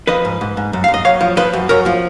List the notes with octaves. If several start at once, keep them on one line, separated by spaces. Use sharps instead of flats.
F3 B4 D#5
G#2
G#2
G#2
F#2
F#2 F5
D#5
F#2 C#5 F5
F3
F3 B4 D#5
F#2
F#2 A#4 C#5
F3